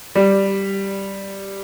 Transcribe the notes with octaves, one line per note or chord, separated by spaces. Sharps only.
G3